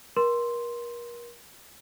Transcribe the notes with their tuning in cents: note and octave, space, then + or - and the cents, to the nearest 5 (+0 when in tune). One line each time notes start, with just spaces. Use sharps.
A#4 +35 C6 +0